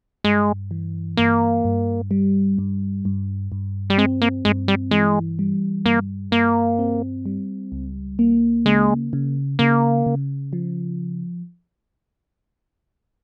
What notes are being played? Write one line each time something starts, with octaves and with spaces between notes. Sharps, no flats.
G2 G#3
E3
G2 A#3
G2
G3
G2
G2
G2
G3
G#3 C4
A#3
G2 G#3
G3
E3 G#3
G3
G2 A#3
G2 A#3
C4
G3
C#2
A#3
C#3 G#3
C#3
C#3 A#3
C#3
F3